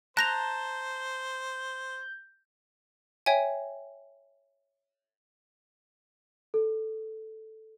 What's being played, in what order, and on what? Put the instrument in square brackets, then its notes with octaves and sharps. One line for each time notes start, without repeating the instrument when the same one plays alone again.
[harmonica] C5 [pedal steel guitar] A5 A#5 [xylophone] F#6 A#6 F7 [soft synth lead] G6
[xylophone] C#5 E5 G5 G#5
[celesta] A4